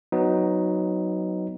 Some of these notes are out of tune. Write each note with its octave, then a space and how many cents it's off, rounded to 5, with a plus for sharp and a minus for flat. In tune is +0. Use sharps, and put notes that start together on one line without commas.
F#3 +0 B3 +20 D#4 +5